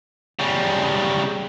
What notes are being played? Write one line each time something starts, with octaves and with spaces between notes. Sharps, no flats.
C#3 G3